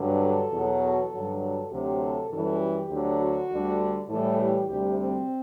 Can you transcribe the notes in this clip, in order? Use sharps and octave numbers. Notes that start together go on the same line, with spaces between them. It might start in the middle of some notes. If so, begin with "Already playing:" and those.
Already playing: G2 D3 F#3
A4
E2 B2 F#3
A4
G2 D3 F#3
A4
D2 C3 F#3 G4
A4
F#2 E3 G3 A4
G4
D2 D3 F#3
F#4
D2 D3 G3
A2 E3 G3 A4
G4
D2 C3 G3 G4
C4